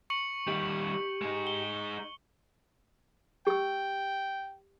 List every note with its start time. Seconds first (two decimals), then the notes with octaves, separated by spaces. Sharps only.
0.10 C#6 C#7 F#7
0.48 D#3 G3 G4
1.21 G#3 D#4
1.47 G7
3.47 G4 G5 E6